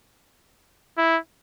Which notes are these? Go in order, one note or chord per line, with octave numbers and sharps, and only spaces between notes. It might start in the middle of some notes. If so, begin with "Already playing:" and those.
E4